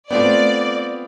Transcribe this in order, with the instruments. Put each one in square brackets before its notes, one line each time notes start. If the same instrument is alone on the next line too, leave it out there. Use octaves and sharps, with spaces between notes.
[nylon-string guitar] A3 C5 G5 [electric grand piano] B3 C4 F4 [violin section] D5